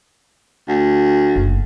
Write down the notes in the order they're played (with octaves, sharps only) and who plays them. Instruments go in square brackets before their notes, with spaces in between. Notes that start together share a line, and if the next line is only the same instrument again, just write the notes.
[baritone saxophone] D2
[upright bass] F#1